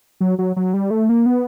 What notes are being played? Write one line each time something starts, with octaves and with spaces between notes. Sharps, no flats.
F#3
F#3
F#3
G3
A3
A#3
B3